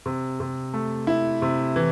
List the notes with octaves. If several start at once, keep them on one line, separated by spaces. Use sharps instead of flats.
C3
C3
A3
E4
C3
E3